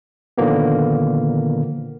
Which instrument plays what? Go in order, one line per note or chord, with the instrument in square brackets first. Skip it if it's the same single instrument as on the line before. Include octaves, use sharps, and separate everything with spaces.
[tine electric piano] A#2 D3 D#3 F3 A#3 B3